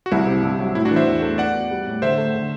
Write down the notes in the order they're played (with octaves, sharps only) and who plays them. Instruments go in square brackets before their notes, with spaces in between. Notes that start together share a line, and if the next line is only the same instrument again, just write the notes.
[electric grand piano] F#4
[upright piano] C2 [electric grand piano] E4
[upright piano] C3
G2
F#3
[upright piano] A2 [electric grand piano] E4
[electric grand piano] D4 F#4
[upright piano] E3
[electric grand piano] C5 E5
[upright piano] E2
A3
[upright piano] B3 [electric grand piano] D5 F#5
[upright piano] F#4
G3
A2
[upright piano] D3 [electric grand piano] C5 E5
[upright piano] A3
D3